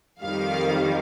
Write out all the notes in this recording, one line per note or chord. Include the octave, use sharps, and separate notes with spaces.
F2 D#3 G3 F5